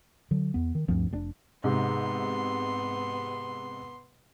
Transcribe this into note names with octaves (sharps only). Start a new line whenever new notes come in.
D3 F#3
E2 B3
D#3
D2 G2 F3 C4
F1 A#2 D4
G#2 C3 B3 C6